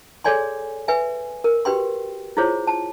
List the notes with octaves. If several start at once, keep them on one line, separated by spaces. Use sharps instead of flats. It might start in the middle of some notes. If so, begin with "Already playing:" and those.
G#4 A4 C#5 D5 G#5 C6
B4 E5 G#5
A#4
F#4 G4 B4 G5 C6
E4 F4 G#4 C5 C#5
A5